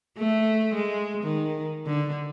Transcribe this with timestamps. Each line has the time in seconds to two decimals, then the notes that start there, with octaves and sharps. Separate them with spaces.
0.18 A3
0.74 G#3
1.23 D#3
1.86 D3